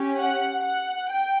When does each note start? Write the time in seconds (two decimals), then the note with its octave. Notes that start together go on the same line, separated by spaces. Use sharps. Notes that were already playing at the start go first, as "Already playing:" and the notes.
Already playing: C#4 G4
0.18 F#5
0.64 F#5
1.10 G5